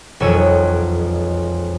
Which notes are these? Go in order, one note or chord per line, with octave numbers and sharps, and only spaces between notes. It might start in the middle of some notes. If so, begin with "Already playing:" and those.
E1 B1 F2 C#5 E6 D#7